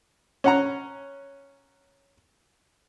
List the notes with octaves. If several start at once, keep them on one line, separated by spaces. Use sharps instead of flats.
C#4 F#5 A#5